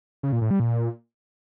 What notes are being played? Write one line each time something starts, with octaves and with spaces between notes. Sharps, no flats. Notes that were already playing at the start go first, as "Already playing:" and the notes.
C#3
A#2
A2
G3
A#2